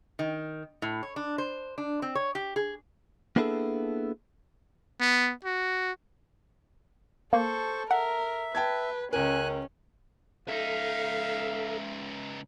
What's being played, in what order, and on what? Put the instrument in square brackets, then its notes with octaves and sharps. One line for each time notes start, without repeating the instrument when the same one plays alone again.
[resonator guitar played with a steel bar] D#3
A2
C#5
D4
C5
D4
C4
C#5
G4
G#4
[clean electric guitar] A#3 B3 D4 E4 G#4 A4
[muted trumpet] B3
F#4
[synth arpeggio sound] A#3 [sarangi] A4 [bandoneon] C5 C#6
[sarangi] A#4 [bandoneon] E5 [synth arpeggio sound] F#5
[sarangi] B4 [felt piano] G5 A5 G#6
[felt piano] C#2 A#4 [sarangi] C#4 [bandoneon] G#5 F#6
[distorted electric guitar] C#2 D#4 [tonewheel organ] A4 [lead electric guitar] E5 [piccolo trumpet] F5